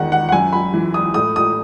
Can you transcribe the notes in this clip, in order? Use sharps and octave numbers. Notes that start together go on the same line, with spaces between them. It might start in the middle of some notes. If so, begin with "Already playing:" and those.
Already playing: E2 D#3 F#5
F#5
F#5
F#2 G#5
B5
E3
D#6
A2 D#6
D#6